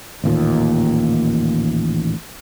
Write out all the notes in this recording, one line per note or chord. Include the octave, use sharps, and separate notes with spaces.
A1 D#2 A#2